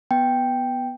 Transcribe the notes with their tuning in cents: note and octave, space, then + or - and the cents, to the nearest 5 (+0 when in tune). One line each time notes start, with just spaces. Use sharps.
B3 +0 G5 +0